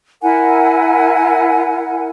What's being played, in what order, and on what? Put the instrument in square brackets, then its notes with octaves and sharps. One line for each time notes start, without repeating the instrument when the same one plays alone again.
[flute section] E4 A#4 F#5 G#5